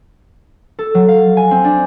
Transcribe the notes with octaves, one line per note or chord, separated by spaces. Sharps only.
A4
F#3
F5
G#5
C4
D4